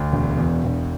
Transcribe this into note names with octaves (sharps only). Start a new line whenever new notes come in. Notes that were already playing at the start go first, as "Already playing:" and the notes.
Already playing: D2
E1
E2
E1